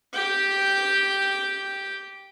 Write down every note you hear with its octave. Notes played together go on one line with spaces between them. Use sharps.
G4 G5